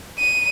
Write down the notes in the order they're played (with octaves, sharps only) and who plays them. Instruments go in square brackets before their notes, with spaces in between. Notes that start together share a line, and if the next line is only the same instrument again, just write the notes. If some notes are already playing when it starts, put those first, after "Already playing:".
[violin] D#7